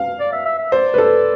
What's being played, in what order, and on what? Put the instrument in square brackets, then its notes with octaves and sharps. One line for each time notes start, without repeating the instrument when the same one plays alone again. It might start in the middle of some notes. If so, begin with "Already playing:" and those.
Already playing: [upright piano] F5
[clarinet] D5
E5
E5
E5
[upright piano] C5 [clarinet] D5
[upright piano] B4
A4